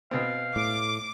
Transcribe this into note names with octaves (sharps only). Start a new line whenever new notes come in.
B2 C4 F5
A2 D6